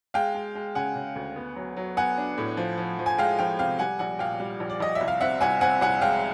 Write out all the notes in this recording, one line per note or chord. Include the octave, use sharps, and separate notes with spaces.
G#3 F5 G5
G#3
G#3
C#3 F#5 G#5
C#3
D2
B3
F#3
F#3
B3 F#5 G#5
D4
A2
F3
F3
F3
G#5
G#3 F5 G5
F3 F5 G5
C3 F5 G5
G3 F#5 G#5
A#1 F#5 G#5
A#2 F5 G5
G3
A#1
D5
A#1 D#5
E5
C2
F5
C4 E5 F#5
C2 F#5 G#5
C4 F#5 G#5
C2 F#5 G#5
G#3 F5 G5